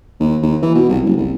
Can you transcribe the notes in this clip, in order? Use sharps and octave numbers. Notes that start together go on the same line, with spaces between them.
D#2
D#2
E3
B2
C2
F#1
C2